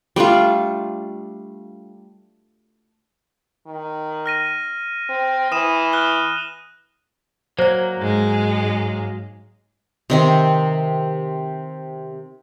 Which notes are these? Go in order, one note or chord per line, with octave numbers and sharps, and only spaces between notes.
G3 A3 D4 F4
D#3
F6 A#6 D#7
C4
E3 D#6 D#7 E7
F6 F#6 G7
F#3 A#3 C5 D5
G#2 G#3
C3 D#3 C4